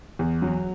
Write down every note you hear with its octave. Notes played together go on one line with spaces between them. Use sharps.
E2
F#3